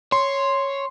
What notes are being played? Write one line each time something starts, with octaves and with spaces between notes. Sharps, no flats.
C#5 C6